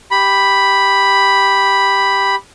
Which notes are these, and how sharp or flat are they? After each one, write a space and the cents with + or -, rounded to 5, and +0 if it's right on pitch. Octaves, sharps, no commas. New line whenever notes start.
G4 +0 B5 +0